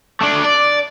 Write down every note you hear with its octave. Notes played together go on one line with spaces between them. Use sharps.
A3 D4
D5